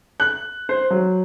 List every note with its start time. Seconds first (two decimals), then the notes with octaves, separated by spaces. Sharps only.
0.20 F#6
0.69 C5
0.90 F#3